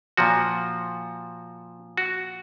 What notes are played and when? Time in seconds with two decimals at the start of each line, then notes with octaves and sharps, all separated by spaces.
0.17 A#2 F3 F#4
1.97 F#4